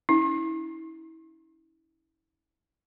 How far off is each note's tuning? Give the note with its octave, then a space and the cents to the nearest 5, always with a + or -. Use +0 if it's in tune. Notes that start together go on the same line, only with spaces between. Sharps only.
C#4 +20 E4 -30